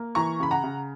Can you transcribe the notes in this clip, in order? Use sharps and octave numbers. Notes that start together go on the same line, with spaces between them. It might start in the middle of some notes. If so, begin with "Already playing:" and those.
Already playing: A#3
E3 A#5 C#6
C#3 B5
F#5 A#5
C#3